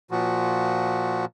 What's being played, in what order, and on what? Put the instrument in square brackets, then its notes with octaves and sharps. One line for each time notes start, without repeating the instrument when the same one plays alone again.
[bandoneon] A#2 F3 F#4